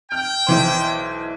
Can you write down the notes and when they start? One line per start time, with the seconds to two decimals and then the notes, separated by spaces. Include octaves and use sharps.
0.12 G5 F6
0.47 B1 E3 C5